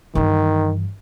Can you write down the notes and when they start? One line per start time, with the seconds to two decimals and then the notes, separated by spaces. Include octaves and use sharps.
0.15 G2 D#3 E3